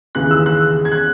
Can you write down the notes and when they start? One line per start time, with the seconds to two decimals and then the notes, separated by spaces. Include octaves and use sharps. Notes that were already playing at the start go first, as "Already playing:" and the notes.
0.15 D#2 C#3 E3 F#6
0.31 E6
0.46 F#6
0.85 G#6
0.92 F#6